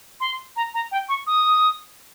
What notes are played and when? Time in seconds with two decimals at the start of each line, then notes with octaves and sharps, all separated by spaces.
0.20 C6
0.56 A#5
0.74 A#5
0.92 G5
1.09 C#6
1.27 D#6